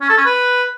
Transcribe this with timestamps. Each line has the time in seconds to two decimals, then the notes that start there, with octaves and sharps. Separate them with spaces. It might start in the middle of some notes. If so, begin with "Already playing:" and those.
0.01 C#4
0.09 A4
0.17 C#4
0.25 B4